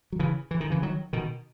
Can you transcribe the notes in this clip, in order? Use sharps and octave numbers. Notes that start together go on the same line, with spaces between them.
F#3
C#3 E3
E3
D#3
C#3 E3
D#3 F#3
B2 D#3